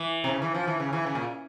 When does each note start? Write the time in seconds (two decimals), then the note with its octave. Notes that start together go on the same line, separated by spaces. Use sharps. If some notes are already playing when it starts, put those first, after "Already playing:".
Already playing: E3
0.24 C3
0.29 C#3
0.42 E3
0.55 F3
0.67 E3
0.80 C#3
0.93 E3
1.06 C#3
1.15 A#2